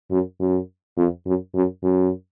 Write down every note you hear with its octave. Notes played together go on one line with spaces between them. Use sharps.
F#2
F#2
F2
F#2
F#2
F#2